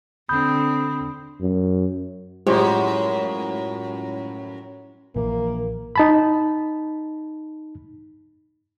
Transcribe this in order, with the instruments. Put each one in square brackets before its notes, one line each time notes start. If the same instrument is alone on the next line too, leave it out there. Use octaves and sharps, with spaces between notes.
[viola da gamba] D3 C4 [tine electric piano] B5 D#6 G6
[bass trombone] F#2
[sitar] F#2 [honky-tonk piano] A2 F3 [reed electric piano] G#3 C#6 [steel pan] G4 C5
[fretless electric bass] A#1 E3 [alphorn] A#3
[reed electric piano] D#4 A5 B5